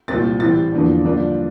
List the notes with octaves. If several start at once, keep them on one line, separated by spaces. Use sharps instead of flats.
C2 A#2 A3 C4 A6
A2 E3 G3 C4 A6
E2 D3 F3 A#3 D4
G2 D3 F3 A#3 D4